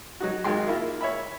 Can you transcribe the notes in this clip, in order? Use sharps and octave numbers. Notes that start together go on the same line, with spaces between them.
F#3 D#4 F#4
G#1 F#3 G#3 G5 C6
A#3 E4 F4
C#5 E5 B5